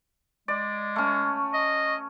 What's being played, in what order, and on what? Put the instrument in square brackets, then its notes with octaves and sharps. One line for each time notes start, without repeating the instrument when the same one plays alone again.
[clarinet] G#3 [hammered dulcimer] D5
[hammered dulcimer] A3 C#4
[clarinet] D#5